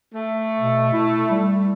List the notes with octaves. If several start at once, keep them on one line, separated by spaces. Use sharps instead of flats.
A3
B2
E4
G3